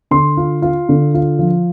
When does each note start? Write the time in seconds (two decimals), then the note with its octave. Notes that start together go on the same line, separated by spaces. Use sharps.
0.11 D3 C6
0.37 F4
0.62 F4
0.89 D3
1.14 F4
1.39 F3